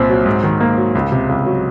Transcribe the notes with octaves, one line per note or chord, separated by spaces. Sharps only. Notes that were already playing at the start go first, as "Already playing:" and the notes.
Already playing: C2 A#2 C4
F#3
G#2
D#3
A#3
F#3
C#2
C3
C#2
F#3